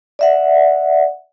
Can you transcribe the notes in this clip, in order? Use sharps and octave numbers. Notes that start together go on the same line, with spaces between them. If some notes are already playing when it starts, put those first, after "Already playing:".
D5 E5 F#5